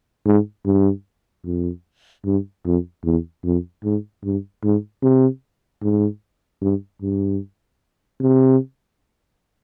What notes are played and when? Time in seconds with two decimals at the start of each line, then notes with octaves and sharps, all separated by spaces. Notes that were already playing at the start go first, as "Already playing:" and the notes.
0.26 G#2
0.65 G2
1.45 F2
2.25 G2
2.65 F2
3.04 E2
3.44 F2
3.84 G#2
4.24 G2
4.63 G#2
5.02 C3
5.82 G#2
6.61 G2
7.02 G2
8.21 C3